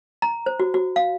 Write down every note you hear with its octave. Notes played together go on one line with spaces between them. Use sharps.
A#5
C5
F#4
F#4
F5